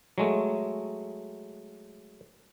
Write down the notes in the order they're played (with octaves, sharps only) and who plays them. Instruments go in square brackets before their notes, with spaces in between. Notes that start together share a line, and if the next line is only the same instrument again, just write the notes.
[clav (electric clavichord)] F#3 G#3 A3